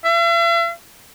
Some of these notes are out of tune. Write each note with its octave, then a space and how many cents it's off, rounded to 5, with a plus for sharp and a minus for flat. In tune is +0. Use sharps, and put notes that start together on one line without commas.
E5 +45